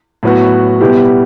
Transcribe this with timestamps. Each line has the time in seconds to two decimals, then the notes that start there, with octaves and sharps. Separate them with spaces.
0.23 A2 F#3 B3 F#4
0.80 B2 G3 B3 E4 G4